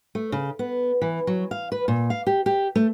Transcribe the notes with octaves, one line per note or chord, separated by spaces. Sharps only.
A3
C#3
B3
E3
F#3
F5
B4
A#2
F5
G4
G4
A3